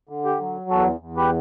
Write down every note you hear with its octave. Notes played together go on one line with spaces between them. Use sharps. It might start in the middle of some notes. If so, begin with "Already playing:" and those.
D3
G4
F#3
E2 F#4 A4
E2
G4 B4